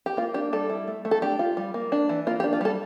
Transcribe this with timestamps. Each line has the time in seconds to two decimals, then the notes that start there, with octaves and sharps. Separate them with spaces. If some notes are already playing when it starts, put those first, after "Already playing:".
0.06 G4
0.17 A#3 F4
0.34 D4 G4
0.53 G3 A4
0.70 E4
0.87 A3
1.05 A3
1.11 A4
1.22 D4 G4
1.39 F4
1.57 G3
1.74 A#3
1.92 D4
2.09 E3
2.27 A#3 F4
2.40 G4
2.44 D4
2.53 F4
2.61 G3 A4